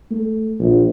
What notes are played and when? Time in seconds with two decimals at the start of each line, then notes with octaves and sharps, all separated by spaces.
0.11 A3
0.59 A#1